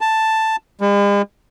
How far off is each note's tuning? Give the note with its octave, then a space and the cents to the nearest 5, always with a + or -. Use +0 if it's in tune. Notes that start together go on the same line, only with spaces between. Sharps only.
A5 +5
G#3 -45